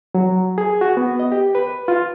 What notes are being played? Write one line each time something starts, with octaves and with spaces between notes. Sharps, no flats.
F#3
G#4
F#4
B3
D#5
G4
B4
F4